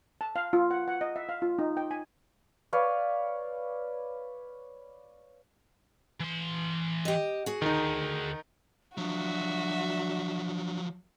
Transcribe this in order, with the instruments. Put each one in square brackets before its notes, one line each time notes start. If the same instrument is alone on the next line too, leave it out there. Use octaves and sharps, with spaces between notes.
[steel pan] A5
F5
F4
F#5
F#5
D#5
E5
F5
F4
D#4
G5
G#5
[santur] B4 C#5 D5 F5
[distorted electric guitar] E3 C6
[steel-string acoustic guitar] G4 D#5
F#4 G#4
[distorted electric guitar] D2 [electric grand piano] D#3 D#4
[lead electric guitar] F3 F#3 [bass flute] D4 [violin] F#4 E5